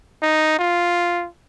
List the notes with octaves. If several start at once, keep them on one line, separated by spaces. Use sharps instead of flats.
D#4
F4